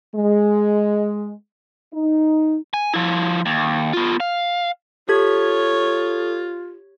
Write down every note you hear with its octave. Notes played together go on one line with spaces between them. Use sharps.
G#3
D#4
G#5
F3 E4
D#2
B3 F4
F5
F4 G4 A4 C#5 G#6